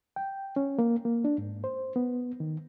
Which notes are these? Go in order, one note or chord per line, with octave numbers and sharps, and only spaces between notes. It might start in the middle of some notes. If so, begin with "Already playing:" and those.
G5
C#4
A#3
A#3
D4
G#2
C5
B3
D#3